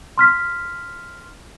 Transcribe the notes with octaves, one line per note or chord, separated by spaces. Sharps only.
C6 F6 B6